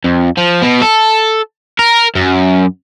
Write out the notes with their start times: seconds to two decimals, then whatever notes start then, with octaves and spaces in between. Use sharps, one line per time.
0.04 F2
0.38 F3
0.62 B2
0.82 A4
1.79 A#4
2.15 F#2